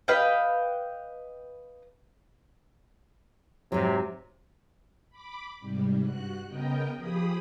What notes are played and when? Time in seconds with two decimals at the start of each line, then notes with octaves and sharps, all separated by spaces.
0.08 B4 D#5 F5 G5
3.72 G#2 C3 F#3
5.10 B5 D6
5.60 G#2 C3 G3
6.02 G2 F#4 F#6
6.47 C#3 B3 A#4 D#5 G5
6.97 F3 G4 G#4 B5 D#6